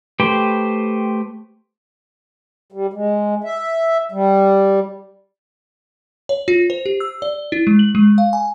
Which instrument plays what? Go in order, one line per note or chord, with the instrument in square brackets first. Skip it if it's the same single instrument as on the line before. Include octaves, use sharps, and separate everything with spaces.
[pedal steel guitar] A3 G4 B4 C5 G5
[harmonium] G3
G#3
E5
G3
[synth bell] C#5
F4
C5
G4
E6
D5
E4
G#3
F#7
G#3
F5
G#5